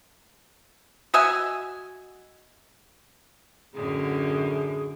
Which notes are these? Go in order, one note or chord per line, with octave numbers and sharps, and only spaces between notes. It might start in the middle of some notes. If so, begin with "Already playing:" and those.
F#4 D#5 E5 G#5
F#2 A2 D3 G#4